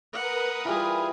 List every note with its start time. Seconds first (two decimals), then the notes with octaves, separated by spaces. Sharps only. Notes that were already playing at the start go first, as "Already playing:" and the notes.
0.13 A#4 B4 F#5 D#6
0.65 E3 G3 F4 G#4